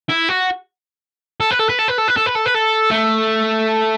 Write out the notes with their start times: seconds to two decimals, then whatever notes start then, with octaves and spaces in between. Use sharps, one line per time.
0.09 E4
0.29 F#4
1.40 A4
1.51 B4
1.59 A4
1.69 B4
1.79 A4
1.88 B4
1.98 A4
2.08 B4
2.17 A4
2.26 B4
2.35 A4
2.46 B4
2.54 A4
2.91 A3